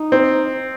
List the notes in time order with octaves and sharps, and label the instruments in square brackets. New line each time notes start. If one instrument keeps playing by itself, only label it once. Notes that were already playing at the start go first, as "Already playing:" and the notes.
Already playing: [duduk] D#4
[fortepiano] C4